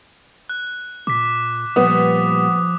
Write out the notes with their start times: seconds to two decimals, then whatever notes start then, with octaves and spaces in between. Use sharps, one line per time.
0.49 F#6
1.07 A#2 D6 B6
1.76 A#2 F3 G3 B3 D#6